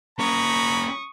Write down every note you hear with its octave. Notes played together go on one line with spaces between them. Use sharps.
A#3 C#4 A#5 B5 C#6 D#6